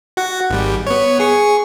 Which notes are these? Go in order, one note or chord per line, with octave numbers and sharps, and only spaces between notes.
F#4 F#5
G#1 G3
B3 C#5
G#4 C#6